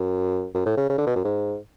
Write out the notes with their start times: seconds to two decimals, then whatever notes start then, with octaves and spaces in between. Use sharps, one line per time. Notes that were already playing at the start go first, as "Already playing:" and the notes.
Already playing: F#2
0.55 F#2
0.66 A2
0.78 C#3
0.90 C#3
0.98 D3
1.07 B2
1.16 F#2
1.25 G#2